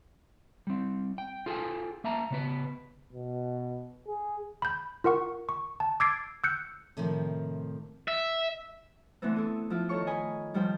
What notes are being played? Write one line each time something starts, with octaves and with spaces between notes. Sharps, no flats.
G3 C4
G5
F4 G#4 A4 G5 G#5
A#3 E5 A5 A#5
C#3 B3 B4
B2
G#4
B5 G6
F4 A#4 F#5 C#6
C#6
A5
D6 E6 G#6 A6 C7 D7
E6 F#6 G6 C#7
A2 C3 D#3 F3
E5
D3 E3 A3 B3 C4
E4 A4 D#6
F3 E4 F4
D#3 A4 C#5 C#6
D#5 G#5 B5
D#3 F3 G3 C5 G5